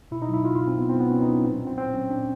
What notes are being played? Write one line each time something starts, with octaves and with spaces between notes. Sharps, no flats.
B2 E4
D#4
F#3 E4
B2 F4
F4
F#3
C4
B2 B3
C4
F#3 B3
B2 C#4
D#4
F#3
D4
A#2 C4
F#3
C4
A#2 C4
F#3 C#4
A#2 D4